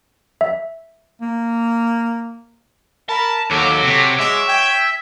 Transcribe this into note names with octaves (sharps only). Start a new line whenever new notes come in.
E5
A#3
A#4 A5 B5
D#2 A4 C#5 F#5 D6
C3
G#3 E5
G5 G#6